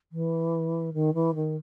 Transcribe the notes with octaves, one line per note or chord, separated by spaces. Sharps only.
E3
D#3
E3
D#3